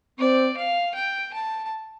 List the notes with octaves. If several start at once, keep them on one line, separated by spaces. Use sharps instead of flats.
C4 D5
F5
G5
A5